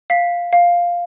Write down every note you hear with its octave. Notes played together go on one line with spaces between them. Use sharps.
F5 B6
F5